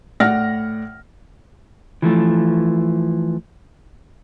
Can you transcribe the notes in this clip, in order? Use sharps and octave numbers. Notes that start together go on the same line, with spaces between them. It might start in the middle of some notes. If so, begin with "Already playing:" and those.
A2 D5 F#5 F6 A#6
E3 F3 A3